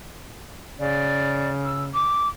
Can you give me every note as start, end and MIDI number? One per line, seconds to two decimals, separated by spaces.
0.79 2.08 49
0.79 1.50 74
1.64 1.83 88
1.94 2.28 86